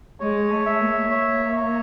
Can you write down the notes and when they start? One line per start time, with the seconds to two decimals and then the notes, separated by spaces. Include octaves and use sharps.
0.20 G#3 C#5
0.51 A3
0.66 E5
0.80 A#3
1.11 A#3 C#5
1.57 C#5